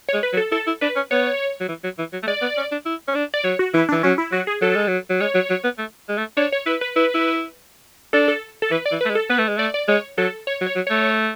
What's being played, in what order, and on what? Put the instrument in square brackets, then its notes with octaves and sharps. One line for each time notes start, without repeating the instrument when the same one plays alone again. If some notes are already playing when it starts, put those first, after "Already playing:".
[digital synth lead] C#5
[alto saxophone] G#3
[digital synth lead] B4
[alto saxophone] F#3
[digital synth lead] A4
[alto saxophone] E4 [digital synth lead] A4
[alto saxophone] E4
[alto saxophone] D4 [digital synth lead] B4
[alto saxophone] C#4
[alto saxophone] B3 [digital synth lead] C#5
[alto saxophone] F#3
E3
F#3
E3
F#3
A3
[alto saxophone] G#3 [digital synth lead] D5
[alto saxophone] B3
C#4
D4
E4
C#4
D4
[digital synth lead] D5
[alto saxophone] F#3 [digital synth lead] C#5
[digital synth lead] F#4
[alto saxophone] E3 [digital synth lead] E4
[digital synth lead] D4
[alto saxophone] E3
[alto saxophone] F#3 [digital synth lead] C#4
[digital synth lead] E4
[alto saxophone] F#3 [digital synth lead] F#4
[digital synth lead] G#4
[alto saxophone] F#3 [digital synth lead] A4
[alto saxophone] G#3
F#3
F#3
[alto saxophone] G#3 [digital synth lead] C#5
[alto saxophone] F#3
F#3
B3
A3
G#3
A3
[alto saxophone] D4 [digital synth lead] C#5
[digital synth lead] C#5
[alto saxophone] E4 [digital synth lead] B4
[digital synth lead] B4
[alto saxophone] E4 [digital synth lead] B4
[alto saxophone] E4
[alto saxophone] D4 [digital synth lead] A4
[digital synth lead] A4
A4
[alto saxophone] E3 [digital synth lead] B4
[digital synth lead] D5
[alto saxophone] E3
[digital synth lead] B4
[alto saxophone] A3
G#3
[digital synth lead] A4
[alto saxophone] B3 [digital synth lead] B4
[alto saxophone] A3
G#3
[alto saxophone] A3 [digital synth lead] D5
[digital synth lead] D5
[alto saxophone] G#3 [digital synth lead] C#5
[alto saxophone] F#3 [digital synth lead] A4
[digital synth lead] C#5
[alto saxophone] F#3
[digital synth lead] C#5
[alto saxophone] F#3
[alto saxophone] A3 [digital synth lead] C#5